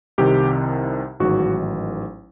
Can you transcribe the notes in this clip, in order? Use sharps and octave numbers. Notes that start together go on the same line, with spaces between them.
C2 C3 D#3 G4
A1 G#2 D#3 F#3 F#4